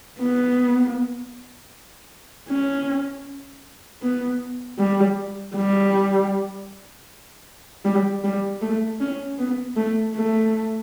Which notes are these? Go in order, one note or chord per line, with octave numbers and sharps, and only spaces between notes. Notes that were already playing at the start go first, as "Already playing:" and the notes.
B3
C#4
B3
G3
G3
G3
G3
A3
C#4
B3
A3
A3